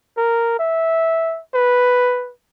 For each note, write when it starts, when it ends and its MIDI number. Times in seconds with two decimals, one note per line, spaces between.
0.18 0.58 70
0.59 1.40 76
1.54 2.31 71